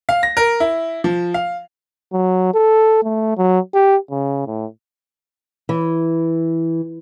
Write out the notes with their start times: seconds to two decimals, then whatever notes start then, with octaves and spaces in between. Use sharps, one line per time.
0.09 F5
0.23 A#6
0.37 A#4
0.60 E4
1.04 F3
1.34 F5
2.13 F#3
2.54 A4
3.03 A3
3.37 F#3
3.74 G4
4.11 C#3
4.47 A2
5.69 E3